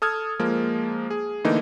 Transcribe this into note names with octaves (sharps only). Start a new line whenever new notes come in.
A4 D#6 F6 G#6
F3 G#3 A#3
G#4
D3 E3 A3 A#3 D#4